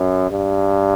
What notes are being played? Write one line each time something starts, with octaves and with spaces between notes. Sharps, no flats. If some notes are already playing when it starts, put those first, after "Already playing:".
Already playing: F#2
G2